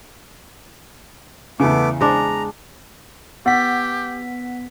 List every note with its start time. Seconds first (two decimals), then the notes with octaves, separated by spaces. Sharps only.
1.60 E2 C#3 A3 B3 D6
2.01 G#3 D4 A#5
3.46 B3 G4 F#5 B6